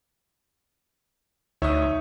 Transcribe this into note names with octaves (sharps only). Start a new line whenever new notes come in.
D2 D#4 C#5 E5 D#6